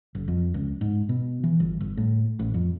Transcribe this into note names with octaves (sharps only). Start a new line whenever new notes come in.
F#1
F2
C#2
G#2
B2
E3
G1
G1
A2
A1
F2